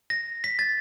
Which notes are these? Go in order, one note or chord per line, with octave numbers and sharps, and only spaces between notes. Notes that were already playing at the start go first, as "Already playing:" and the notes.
A#6
B6
A6